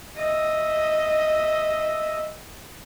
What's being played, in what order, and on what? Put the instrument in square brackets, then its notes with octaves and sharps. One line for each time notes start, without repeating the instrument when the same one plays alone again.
[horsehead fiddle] D#5 E5